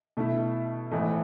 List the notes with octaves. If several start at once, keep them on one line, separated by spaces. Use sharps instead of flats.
B2 A3 E4
A1 G#2 E3 A3